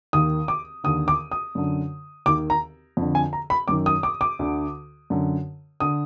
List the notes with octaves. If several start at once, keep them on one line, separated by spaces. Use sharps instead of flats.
D#2 D#3 D#6
D6
D#2 D3 D#6
D6
D#6
F#2 D3
D#2 D#3 D6
A#5
F2 D3
G#5
A#5
B5
F#2 D#3 D6
D#6
D6
D6
D2 D3
F#2 D3
D3 D#6